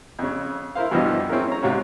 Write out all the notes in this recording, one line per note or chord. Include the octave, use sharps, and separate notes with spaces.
F2 C#3
E4 A#4 C5 F5
G2 B2 E3 F3 G4 D#5
C4 C#4 E4 G#4 A#4
C#4 A#5
G#2 C3 F4 F#4 C#5